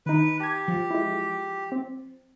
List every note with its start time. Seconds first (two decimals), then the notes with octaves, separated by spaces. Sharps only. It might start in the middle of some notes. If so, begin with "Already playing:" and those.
0.06 D#3 D#4 B4
0.40 G4 A5 G#6
0.68 F3
0.90 G#3 E4
1.72 C4